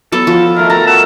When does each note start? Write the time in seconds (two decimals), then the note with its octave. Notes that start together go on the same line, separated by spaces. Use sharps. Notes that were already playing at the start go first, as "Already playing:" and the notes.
0.12 F#3 B3 A4
0.27 F3
0.56 D#3 A3 A#4
0.70 F#4 A4 A5 A#5
0.87 F#5 A5 C#6 E6